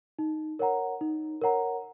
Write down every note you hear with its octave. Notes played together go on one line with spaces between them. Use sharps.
D#4
A#4 C#5 F#5 A#5
D#4
A#4 C#5 F#5 A#5